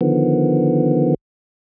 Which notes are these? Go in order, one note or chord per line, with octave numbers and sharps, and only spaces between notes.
D3 D#3 F3 B3